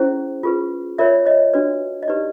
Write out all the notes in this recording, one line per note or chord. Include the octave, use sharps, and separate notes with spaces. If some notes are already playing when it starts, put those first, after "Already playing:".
Already playing: C#4 E4 G#4 C5
F4 G#4 B4
F4 A#4 C#5 D5 E5
C#5 D#5
D4 F#4 B4 D5
D#5
D#4 G4 B4 D5